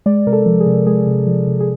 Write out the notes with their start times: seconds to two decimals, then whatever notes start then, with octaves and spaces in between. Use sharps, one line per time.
0.06 G#3 D5
0.27 C3 A#4
0.33 A4
0.46 F3
0.60 G#4
0.66 C3
0.87 G#3 G#4
1.07 C3
1.27 F3
1.47 C3
1.60 G#4